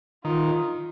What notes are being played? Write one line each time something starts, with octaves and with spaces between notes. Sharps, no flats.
D#3 F4